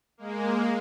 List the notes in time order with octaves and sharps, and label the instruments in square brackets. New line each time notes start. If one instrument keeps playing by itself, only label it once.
[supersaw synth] G#3 A#3